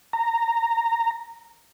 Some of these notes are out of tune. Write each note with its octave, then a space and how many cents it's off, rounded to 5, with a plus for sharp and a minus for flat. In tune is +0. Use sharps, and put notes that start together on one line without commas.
A#5 -15